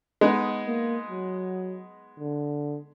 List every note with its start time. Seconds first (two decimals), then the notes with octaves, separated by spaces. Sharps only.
0.21 G#3 B3 D#4
0.68 A#3
1.10 F#3
2.20 D3